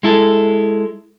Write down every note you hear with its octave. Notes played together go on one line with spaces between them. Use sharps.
G#3 E4 A4